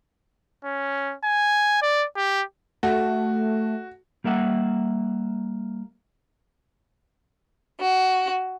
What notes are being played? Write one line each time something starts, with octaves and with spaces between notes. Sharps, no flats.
C#4
G#5
D5
G4
A3 F#4
G3 A#3 E5 F#5
F#4